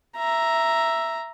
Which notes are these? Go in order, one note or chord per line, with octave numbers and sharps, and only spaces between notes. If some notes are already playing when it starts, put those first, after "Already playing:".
E5 A#5